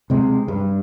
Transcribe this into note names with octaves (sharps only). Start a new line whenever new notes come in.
C3 G#3
G2